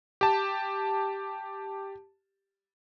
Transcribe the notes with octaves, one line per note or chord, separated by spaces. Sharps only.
G4 A5